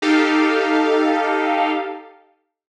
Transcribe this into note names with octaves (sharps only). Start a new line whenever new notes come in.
D#4 G4 A4 F5